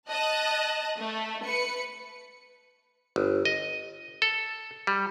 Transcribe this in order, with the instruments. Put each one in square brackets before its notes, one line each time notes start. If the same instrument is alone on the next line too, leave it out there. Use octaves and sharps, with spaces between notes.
[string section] D#5 A5 F#6
A3
B4 C#7
[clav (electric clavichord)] G1
D#5
A4
G3